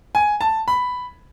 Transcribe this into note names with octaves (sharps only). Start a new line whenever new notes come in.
G#5
A5
B5